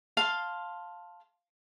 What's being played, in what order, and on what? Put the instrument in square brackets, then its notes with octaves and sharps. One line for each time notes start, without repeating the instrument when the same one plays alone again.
[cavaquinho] F5 A5 C6